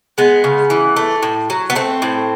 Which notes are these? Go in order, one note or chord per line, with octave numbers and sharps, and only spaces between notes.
G#3 B3
C#3
E3
A3
A2
F#3
B3
A3 C4
A2